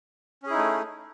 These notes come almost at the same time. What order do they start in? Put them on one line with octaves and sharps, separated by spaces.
C#4 G#4 E4 D#4 A3